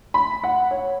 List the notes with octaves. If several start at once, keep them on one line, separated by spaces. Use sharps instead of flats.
B5
F#5
C#5